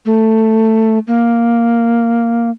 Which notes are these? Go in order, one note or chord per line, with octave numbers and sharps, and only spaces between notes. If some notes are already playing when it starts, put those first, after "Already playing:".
A3
A#3